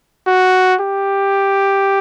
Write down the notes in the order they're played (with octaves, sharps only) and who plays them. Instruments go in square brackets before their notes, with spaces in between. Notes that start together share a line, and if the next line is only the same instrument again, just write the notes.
[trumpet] F#4
G4